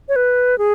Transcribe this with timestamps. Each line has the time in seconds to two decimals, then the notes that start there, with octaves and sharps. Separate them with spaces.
0.09 C#5
0.16 B4
0.58 G#4